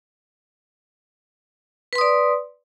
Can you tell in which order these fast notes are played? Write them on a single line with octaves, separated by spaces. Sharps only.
B4 C6 D#6 D5